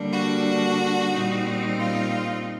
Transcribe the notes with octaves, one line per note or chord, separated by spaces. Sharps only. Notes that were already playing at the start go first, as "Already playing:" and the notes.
Already playing: D3 G3 A#3 D4
F#4
A#2 G3 C4 D#4
F4